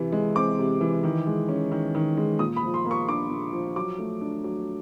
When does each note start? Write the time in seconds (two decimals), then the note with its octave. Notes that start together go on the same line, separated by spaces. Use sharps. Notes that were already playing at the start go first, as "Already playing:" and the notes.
Already playing: C3 E3
0.12 G#3
0.35 C4 D6
0.58 C3
0.81 E3
1.03 D#3
1.27 G#3
1.49 C#4
1.72 D#3
1.95 D#3
2.17 G#3
2.39 A#2 D#6
2.56 B5
2.63 F3
2.74 C6
2.85 A#3
2.91 C#6
3.08 D4 D6
3.30 A#2
3.53 F3
3.76 F#3 D6
3.99 A3
4.21 D4
4.44 F#3